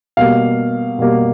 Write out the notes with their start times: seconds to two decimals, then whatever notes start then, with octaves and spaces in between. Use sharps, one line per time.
0.17 B2 G3 A#3 F5
0.98 B2 G3 A#3